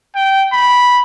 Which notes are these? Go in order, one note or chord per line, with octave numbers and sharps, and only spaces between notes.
G5
B5